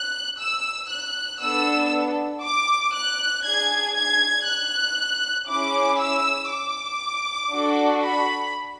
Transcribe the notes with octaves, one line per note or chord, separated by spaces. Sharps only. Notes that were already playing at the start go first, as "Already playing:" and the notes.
Already playing: F#6
E6
F#6
B3 D4 A4 E6
D6
F#6
D4 G#4 G#6
G#6
F#6
C#4 E4 G#4 D6
E6
D6
D4 F#4 A4
B5